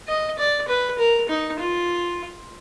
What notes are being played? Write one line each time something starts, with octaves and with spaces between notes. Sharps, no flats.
D#5
D5
B4
A#4
D#4
F4